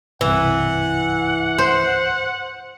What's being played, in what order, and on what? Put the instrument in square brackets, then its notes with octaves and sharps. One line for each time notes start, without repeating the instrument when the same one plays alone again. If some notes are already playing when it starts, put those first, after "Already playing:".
[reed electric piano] C2 G2 B5 [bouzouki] E3 [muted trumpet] F#5
[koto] C5